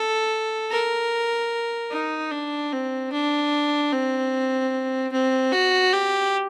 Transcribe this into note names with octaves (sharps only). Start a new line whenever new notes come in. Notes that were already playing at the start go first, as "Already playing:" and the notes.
Already playing: A4
A#4
D#4
D4
C4
D4
C4
C4
F#4
G4